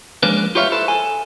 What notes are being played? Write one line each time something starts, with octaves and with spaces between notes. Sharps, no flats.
F3 G#3 A#3 C#4 D4 B4
F4 G4 B4 C#5 E5 F5
E4 A4 B4 C5
A4 G#5